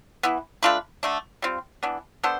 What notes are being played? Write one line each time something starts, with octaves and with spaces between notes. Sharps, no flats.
E3 B3 E4
A3 D4 F4 B4
D3 A3 D4
G3 C4 F4
E3 B3 D4
B3 D4 A4 C5